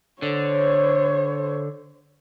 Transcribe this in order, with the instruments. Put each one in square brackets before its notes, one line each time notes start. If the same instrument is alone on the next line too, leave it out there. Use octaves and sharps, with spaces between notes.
[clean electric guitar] D3 [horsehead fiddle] C5 C#5